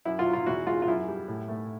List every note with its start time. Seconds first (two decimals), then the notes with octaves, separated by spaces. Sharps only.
0.05 F#2 E4
0.19 F4
0.26 F#3
0.33 F4
0.46 E2 E4 F#4
0.66 G#3 F4
0.82 F4
0.87 F#2 E4
1.08 G3
1.28 A2
1.48 A3